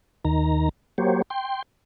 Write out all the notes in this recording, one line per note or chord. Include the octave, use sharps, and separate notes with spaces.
D#2 D#3 A#5
F#3 A#3 G4 C5 C#5
G5 C6